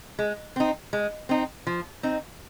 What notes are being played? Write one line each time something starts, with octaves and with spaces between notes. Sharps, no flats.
G#3
C4 D#4
G#3
C4 D#4
F3
C4 D#4